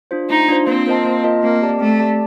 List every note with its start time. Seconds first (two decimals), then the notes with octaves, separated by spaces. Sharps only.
0.11 D4 F4 C5
0.30 A3 D#4
0.48 D4 F4 C5
0.67 A#3 C4
0.87 F4 A#4 D#5 A5
1.05 A#3
1.24 F4 A#4 D#5 A5
1.43 A#3 C4
1.62 G4 D5 A5
1.80 A3 C4
1.99 G4 D5 A5